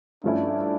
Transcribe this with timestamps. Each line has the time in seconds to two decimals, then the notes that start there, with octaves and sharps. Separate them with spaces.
0.24 G2 F3 A3 C#4 D4 E4